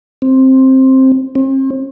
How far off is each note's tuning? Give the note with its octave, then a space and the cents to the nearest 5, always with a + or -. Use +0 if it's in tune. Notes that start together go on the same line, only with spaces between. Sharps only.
C4 +10
C4 +40